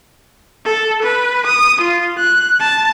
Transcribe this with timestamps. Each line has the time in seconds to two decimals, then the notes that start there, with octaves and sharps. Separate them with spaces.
0.65 A4
1.03 B4
1.47 D#6
1.82 F4
2.19 F#6
2.60 A5